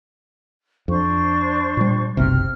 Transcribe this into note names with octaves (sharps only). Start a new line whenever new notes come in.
F2 D4 C5 C#6
A#2 G3
F#1 B1 C3 F6